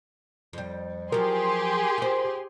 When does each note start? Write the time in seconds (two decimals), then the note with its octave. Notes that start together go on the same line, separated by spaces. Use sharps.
0.53 F2 G3
1.12 F3 F#3 G4 G#4 A#4 C6
1.98 F4 C5